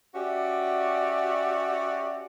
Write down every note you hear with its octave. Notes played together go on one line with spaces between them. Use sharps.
C#4 F#4 G4 D5 E5